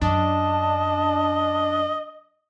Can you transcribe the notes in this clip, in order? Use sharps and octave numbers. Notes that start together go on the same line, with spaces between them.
F#2 D4 D#5 A5